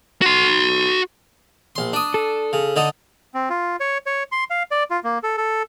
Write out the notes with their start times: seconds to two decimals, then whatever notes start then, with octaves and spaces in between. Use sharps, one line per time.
0.22 F#4 C6
1.76 A#1 C6
1.93 D4 D#6
2.14 A4
2.53 C#3
2.76 D3 D#4 A4
3.34 C4
3.50 F4
3.80 C#5
4.06 C#5
4.32 C6
4.50 F5
4.71 D5
4.91 F4
5.04 A#3
5.23 A4
5.38 A4